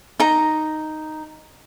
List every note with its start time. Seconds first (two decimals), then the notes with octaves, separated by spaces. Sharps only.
0.20 D#4 A#5